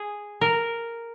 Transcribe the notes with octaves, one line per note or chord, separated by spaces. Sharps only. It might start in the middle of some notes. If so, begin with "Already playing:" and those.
Already playing: G#4
A#4